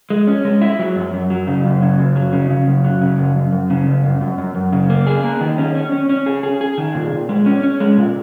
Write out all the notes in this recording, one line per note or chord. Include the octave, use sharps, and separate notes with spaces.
G#3
C#4
G#3
E4
F#3
F#2
F#2
F#3
C#3
F#2
C#3
F#2
F#3
C#3
C#3
F#2
F#3
C#3
F#2
F#2
F#2
C#3
F#2
F#2
F#2
F#2
F#2
C#3
A#3
G#4
A#3
D#3
C#4
C#4
C#4
C#4
G#4
G#4
G#4
D#3
A#2
A#2
G#3
C#4
C#4
G#3
A#2